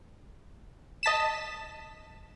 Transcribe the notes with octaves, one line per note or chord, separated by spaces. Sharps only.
D#5 A5 B6 E7